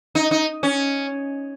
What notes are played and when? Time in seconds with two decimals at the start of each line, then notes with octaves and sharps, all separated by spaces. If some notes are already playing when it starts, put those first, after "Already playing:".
0.15 D#4
0.31 D#4
0.63 C#4